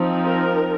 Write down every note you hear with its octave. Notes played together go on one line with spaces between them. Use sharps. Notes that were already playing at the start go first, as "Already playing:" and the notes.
Already playing: F3 C4 D#4
A#4